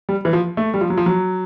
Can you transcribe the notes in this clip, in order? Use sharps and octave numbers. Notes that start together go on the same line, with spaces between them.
G3
E3
F3
A3
G3
F3
F#3
F3
F#3